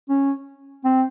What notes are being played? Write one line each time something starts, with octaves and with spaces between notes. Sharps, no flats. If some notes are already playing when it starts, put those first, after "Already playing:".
C#4
C4